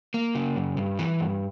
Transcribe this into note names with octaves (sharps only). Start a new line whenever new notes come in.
A#3
C#3
F#2
G2
E3
G2